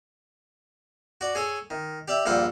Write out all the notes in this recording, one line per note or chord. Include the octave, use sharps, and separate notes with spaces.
F#4 D5
G#4 A4 C#5 G#5
D#3
G4 D5 E5
A#1 G2 F4 A4 F#5 G5